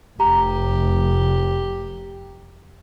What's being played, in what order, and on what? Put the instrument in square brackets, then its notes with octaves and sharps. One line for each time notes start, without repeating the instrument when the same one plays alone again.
[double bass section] F1 [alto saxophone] G4 [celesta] A#5